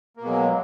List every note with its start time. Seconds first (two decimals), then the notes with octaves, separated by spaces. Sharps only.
0.17 A#3
0.21 B2
0.25 G#3
0.28 F#3